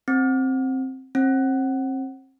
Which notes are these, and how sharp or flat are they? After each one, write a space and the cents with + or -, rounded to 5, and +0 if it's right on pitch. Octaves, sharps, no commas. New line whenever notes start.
C4 +10
C4 +30